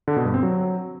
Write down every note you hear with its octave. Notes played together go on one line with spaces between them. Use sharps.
D3
B2
G2
C4
F#3